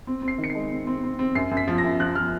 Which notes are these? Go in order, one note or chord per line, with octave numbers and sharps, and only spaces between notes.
C4
C4
C7
D#3
C#7
C7
G#3
C4
C4
C4
C4
F#2 C7
F#2
B6
F3
A#6
F#2
F3 F#6
F3 F6